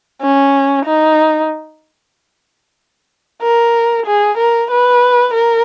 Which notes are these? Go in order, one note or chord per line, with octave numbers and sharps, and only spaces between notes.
C#4
D#4
A#4
G#4
A#4
B4
A#4